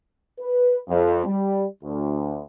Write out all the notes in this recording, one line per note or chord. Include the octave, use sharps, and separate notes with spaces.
B4
F2
G3
D2